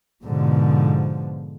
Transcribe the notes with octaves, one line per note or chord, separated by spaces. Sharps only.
G#2 B2 D3 F3